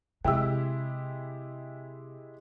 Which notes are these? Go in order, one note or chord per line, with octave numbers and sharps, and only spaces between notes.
C3 G#3 E4 G4 G5 E6